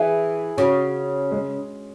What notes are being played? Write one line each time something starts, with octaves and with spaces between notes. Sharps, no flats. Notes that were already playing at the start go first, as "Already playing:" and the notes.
Already playing: E3 E4 G#4
C#3 C#4 F#4
G#3 C#4